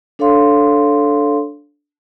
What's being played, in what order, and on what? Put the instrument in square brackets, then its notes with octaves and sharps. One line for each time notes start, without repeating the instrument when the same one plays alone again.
[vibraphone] D4 A4 C#5 F5 C6